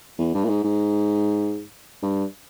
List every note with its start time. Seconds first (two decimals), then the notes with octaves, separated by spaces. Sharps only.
0.19 E2
0.34 G2
0.45 A#2
0.49 G#2
0.64 G#2
2.03 G2